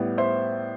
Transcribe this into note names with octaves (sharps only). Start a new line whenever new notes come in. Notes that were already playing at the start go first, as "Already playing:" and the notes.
Already playing: A2 G3 B3
C5 E5